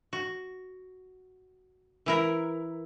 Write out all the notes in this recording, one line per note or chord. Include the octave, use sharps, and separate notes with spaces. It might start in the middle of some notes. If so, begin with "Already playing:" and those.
F#4
E3 E4 A#4